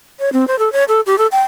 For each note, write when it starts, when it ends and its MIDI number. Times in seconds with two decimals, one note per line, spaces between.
0.20 0.32 73
0.33 0.47 60
0.48 0.58 72
0.59 0.71 69
0.72 0.84 73
0.88 1.00 69
1.06 1.18 67
1.18 1.27 69
1.32 1.41 79